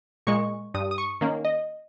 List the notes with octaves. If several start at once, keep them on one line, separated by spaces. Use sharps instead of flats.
A#2 G#3 C#6
G2 D#6
D#6
C#6
D#3 A#3 C#4
D#5